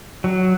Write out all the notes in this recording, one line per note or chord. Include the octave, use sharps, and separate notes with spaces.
F#3